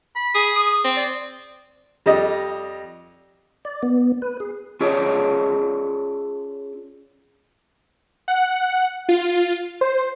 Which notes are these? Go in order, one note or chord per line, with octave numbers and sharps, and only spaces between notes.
B5
G#4
D#6
C4
D5
F2 G3 G4 D5 D#5
D5
B3
B4
G#4
C#4 F4 G#4 A4 C#5 D5
F#5
F4
C5